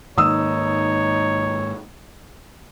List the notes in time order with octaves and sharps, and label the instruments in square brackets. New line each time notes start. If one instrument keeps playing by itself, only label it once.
[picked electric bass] G#2 D#3 A#3 [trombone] D#4 [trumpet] C#5 [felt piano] D#6 E6